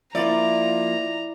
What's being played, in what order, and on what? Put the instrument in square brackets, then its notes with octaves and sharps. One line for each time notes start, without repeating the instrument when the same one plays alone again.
[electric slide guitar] F3 A#3 F4 [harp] E4 [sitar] D5 [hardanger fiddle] A#5